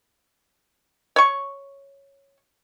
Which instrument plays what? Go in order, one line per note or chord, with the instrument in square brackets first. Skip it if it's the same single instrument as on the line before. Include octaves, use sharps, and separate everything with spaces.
[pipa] C#5 C#6